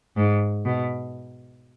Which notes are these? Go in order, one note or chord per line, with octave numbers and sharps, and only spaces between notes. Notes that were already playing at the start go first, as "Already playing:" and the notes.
G#2
B2